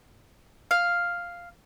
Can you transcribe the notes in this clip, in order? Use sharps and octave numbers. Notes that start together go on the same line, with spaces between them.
F5